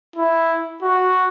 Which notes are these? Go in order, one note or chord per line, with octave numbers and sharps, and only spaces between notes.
E4
F#4